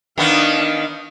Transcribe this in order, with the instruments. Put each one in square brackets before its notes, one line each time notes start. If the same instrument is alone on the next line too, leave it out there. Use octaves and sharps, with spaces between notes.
[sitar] D#3 B3 [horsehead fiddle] D4 F5